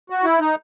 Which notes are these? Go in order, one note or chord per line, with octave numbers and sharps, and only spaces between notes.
F#4
E4
D#4